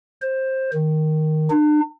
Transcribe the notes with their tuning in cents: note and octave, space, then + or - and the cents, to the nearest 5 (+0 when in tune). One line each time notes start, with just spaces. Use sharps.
C5 +15
D#3 +0
D4 +40